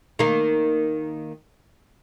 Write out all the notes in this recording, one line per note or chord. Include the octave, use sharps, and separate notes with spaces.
D#3 A#3